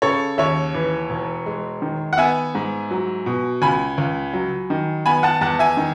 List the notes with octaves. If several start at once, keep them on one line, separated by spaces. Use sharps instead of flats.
C#3 A4 C#5
D#2 C#5 E5
E3
E1
G#3
D#3
F#5
B3 E5 G#5
G#2
F#3
B2
C#2 G#5 B5
C#2
F#3
D#3
B3 G#5 B5
F#5 A5
E2 F#5 A5
E5 G#5
D#3